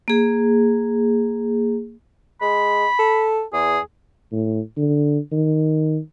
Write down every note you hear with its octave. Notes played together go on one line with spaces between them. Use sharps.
A#3 G#4
G#3 B5
A4
E2 G#4
A2
D3
D#3